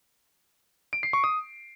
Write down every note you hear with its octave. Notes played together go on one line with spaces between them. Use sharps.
D7
C7
C#6
D#6